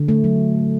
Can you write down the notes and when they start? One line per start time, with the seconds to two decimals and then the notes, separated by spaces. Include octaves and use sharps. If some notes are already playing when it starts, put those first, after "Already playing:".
Already playing: D3
0.08 A3
0.24 F#3